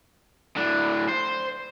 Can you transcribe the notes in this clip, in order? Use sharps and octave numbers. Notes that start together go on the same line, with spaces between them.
A2 D4
C5